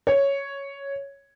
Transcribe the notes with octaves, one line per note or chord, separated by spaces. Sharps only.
C#5